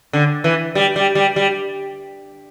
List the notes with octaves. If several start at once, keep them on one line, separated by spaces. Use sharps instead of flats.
D3
E3
G3
G3
G3
G3